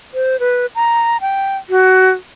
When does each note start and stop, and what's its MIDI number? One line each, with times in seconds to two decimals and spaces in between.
0.14 0.40 72
0.40 0.66 71
0.75 1.17 82
1.21 1.57 79
1.70 2.10 66